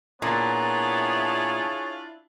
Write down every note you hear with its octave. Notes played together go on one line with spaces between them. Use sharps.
A#2 B3 D4 E4 F4 G#4 C#5 A5